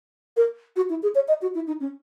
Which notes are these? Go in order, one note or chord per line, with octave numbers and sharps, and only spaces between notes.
A#4
F#4
E4
G#4
C#5
D#5
F#4
E4
D#4
C#4